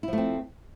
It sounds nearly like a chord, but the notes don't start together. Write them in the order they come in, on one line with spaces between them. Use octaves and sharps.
E4 F3 A3 C4